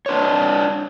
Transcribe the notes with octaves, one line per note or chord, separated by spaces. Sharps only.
D4 B4 C#5